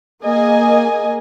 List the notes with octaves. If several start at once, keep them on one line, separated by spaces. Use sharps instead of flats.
A#3 G#4 D#5 G#5